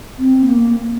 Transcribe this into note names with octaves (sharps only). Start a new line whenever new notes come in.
C4
A#3